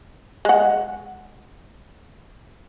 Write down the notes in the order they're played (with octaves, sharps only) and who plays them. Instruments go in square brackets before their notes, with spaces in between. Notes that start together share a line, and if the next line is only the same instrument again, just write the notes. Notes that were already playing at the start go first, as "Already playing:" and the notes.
[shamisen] G#3 F#5